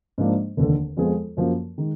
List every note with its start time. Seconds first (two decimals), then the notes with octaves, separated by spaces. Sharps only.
0.18 G#2 F3 A#3 D4
0.57 F1 D#2 D3
0.97 F2 F3 G#3 B3
1.37 F#2 F3 A#3
1.78 D#3 G#3